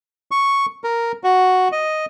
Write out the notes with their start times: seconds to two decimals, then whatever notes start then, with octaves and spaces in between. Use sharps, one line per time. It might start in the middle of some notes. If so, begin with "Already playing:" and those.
0.31 C#6
0.84 A#4
1.24 F#4
1.72 D#5